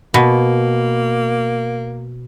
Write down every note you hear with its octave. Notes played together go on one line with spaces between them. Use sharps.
B2 A#3